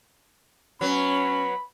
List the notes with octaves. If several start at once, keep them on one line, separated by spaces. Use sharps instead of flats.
F#3 B3 C#4 B5